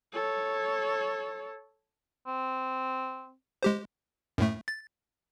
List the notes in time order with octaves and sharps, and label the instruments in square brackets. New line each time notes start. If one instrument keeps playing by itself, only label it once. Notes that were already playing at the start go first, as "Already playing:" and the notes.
[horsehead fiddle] A4 C#5
[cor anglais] C4
[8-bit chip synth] G#3 G4 C5
F#2 A2 A3
A6